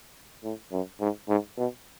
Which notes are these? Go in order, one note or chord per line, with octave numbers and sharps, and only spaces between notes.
A2
F#2
G#2
G#2
B2